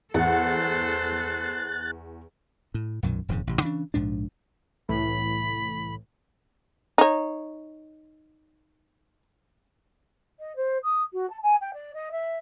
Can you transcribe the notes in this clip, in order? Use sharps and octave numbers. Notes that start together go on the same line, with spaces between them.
E2 A4 C5 F#5 F#6 A6
A2
B1 F#2 A#2 D#3
D#1 F2 G#2 C#3
A1 C3
C#3 E3 B3 D4
A#1 G#2 F3 D4
C2 A2 E3 B5
D#4 C#5
D#5
C5
D#6
F#4
A5
G#5
G5
D5
D#5
E5